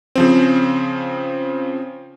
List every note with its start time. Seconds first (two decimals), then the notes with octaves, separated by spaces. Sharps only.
0.15 C#3 F3 C4